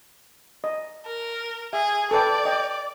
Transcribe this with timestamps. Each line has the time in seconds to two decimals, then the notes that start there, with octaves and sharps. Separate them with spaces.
0.64 D#5
1.06 A#4
1.73 G#4 E5
2.11 A4 B4 D5 G5
2.45 D#5 G5